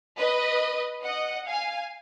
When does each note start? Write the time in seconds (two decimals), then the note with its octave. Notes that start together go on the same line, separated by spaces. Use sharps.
0.18 B4 D#5
1.04 D#5 F#5
1.46 F5 G#5